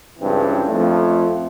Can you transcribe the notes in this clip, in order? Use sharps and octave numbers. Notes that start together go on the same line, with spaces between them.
C#2 G2 C#3 E3 C4
F2 A3